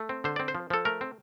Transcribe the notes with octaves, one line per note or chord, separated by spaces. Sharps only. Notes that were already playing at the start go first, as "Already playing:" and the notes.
Already playing: A3
C4
D3 C5
C4 D5
C5
F3
F3 A4
A3 A#4
C4